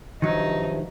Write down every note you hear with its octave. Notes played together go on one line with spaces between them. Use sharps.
G2 C3 D#3 F3 F#3 D#4